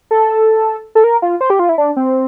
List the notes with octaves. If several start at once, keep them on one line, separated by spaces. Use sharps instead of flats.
A4
A4
A#4
F4
C5
G4
F4
E4
D4
C4